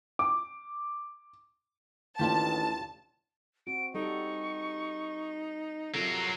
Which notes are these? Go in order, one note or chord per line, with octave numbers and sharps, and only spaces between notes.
D6
A1 D#2 D4 F4 G4 A5
C4 F#4 D7
G3 D#4 A4 C#6
C3 F#3 F4 A4 A#4 C7